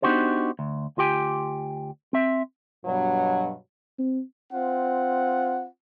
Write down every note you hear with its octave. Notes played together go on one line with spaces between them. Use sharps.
B3 D4 D#4 F#4 G4 C5
D2
D2 F4 G4 G5 G#5
C4 E5
G2 B2 F#3
C4
C4 F4 F#5